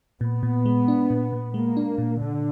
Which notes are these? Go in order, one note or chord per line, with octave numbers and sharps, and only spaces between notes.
A#2 B3
A#2
G#3
D4
A#2
A#2
G#3 A#3
D4
A#2
A#2 D3